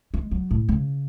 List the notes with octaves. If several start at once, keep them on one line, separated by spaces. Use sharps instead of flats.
G#3
F#3
A2
C#3